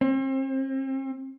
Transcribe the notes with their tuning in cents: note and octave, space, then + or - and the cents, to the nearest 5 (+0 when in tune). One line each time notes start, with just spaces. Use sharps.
C4 +35